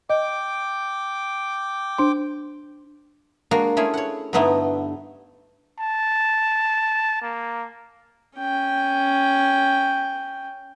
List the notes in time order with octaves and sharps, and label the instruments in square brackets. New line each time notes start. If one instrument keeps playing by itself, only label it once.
[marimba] D#5 [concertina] G5 D6
[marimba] D4 C5 C6
[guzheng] G#3 A#3 D4 F#4
A3 C#4 E4 F4 G#4
C#5 F#5
G2 D3 A3 B3 D#4 E4
[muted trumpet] A5
A#3
[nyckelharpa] C#4 G5